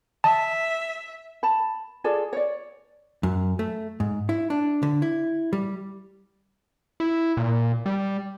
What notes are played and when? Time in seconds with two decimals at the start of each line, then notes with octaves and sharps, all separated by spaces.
0.24 E5 A5
1.43 A5 B5
2.04 F4 G#4 A4 D5
2.33 C#5 D5
3.23 F#2
3.59 A3
4.00 G#2
4.29 E4
4.50 D4
4.83 D3
5.02 E4
5.53 G3
7.00 E4
7.37 A#2
7.86 G3